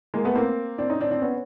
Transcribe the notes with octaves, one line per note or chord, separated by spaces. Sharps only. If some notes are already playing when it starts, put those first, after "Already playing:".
G#3 A#3
A3 B3
A#3 C4
C4 D4
C#4 D#4
C4 D4
C4 D4
B3 C#4